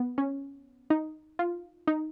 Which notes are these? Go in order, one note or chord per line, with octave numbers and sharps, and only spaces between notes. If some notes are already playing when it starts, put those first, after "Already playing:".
Already playing: B3
C#4
D#4
F4
D#4